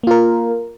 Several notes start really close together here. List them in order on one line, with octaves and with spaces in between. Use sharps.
A#3 F4 A#4